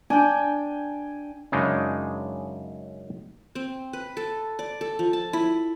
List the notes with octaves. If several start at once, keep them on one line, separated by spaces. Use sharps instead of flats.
D4 G5 G#5
F#2 C#3 G#3 D4 D#4
C4
B4
A4
D5
A4
F3
A5
E4